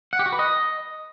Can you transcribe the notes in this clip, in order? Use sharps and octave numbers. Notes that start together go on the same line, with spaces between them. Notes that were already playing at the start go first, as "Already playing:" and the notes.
F#5
G4
F#4
B4
D#5